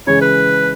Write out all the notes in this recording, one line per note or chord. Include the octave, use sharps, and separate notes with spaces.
C#3 E3 G#3 C#5
B4